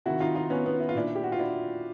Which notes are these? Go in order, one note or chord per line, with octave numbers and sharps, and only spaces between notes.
C3 D#3 E4 F#4
D#4 F4
D#4 F4
B3 C#4
B3
E4
F4
A#2 D4 E4
G4
F#4
F4
D4 E4